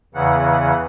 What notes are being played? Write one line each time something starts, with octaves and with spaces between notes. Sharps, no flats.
E2 C#3 E3 F#5